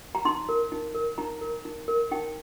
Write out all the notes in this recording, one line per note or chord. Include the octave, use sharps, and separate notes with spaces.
A#5
D#4 C6
A#4
D#4
A#4
D#4 A#5
A#4
D#4
A#4
D#4 G5